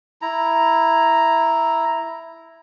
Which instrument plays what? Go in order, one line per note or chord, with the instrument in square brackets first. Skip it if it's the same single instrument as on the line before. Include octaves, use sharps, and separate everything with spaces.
[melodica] E4 A#5